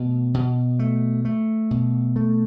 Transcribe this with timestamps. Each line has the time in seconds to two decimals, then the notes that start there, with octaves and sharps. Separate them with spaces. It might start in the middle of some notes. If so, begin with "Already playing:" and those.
Already playing: B2 A3
0.34 B2
0.79 A3
1.25 A3
1.71 B2
2.16 A3